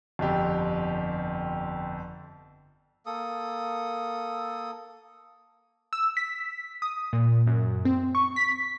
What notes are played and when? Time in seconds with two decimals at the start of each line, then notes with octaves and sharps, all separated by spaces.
0.19 G1 F2 G4
3.06 A#3 A4 D#6
5.93 E6
6.17 B6
6.82 D#6
7.13 A#2
7.47 F#2
7.85 C4
8.15 C#6
8.36 B6